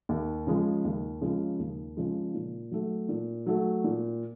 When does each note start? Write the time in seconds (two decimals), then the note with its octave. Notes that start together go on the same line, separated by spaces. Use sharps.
0.09 D#2
0.47 C#3 F3 G#3
0.85 D#2
1.21 C#3 F3 G#3
1.59 D#2
1.97 C#3 F3 G#3
2.34 A#2
2.71 F#3 A3
3.09 A#2
3.46 F#3 A3
3.84 A#2